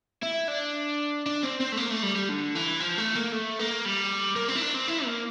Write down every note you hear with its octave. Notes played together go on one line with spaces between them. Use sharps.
E4
D4
D4
C4
C4
A3
A#3
A3
G3
G3
D3
E3
F3
A3
A#3
A3
A#3
G3
A#3
C4
E4
D4
C4
E4
A#3